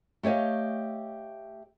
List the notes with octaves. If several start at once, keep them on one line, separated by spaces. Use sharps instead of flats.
A3 G4 C#5 D#5 F5